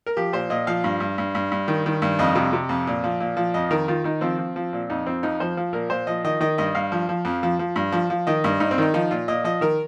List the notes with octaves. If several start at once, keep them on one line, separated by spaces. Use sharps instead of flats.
A#4
F3 G4
A#2 C5
A#2 D#5
F3 F5
G2
G2
G2
G2
G2
D#3
D#3
G2
F2 D#5
C3
C3
F2
A#2
F3
A#2
F3
F2 D#5
D#3 A#4
D#3 F4
D#3 D#4
F3 C4
F3
F3
A#2
F2 D#4
F3 C4
F2 D#4
F3 C5
F3
A#2 A#4
A#2 C5
F3 D#5
D#3 D#5
D#3 D#5
G2 D#5
G2 F5
F3
F3
F2
F3
F3
G2
F3
F3
D#3 D#5
G2
G2 D#4
C4
D#3 D#4
F3 D#4
A#2 F4
A#2 D#5
F3 D#5
D#3 A#4